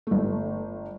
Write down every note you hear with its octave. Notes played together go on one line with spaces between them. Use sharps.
G1 A3